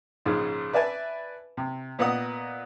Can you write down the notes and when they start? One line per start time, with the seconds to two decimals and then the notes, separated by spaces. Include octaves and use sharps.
0.25 A#1 G#2 C#3 G#3
0.73 B4 D5 E5 G#5 A5
1.57 C3
1.99 A#2 B3 D#5 F#5 D#6